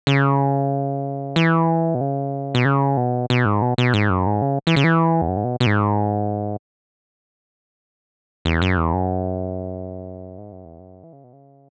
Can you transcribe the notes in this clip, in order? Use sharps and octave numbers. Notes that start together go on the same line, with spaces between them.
C#3
E3
B2
C#3
B2
C#3
B2
B2
G#2
B2
B2
G#2
F#2
G#2
C#3
E3
C#3
E3
E2
F#2
G#2
B2
B2
G#2
E2
F#2
E2
F#2
G#2
F#2
E2
F#2
E3
C#3
B2
C#3